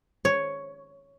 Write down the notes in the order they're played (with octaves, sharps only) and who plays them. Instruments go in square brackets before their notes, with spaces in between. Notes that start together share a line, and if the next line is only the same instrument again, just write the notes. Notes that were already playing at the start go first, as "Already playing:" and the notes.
[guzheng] C#5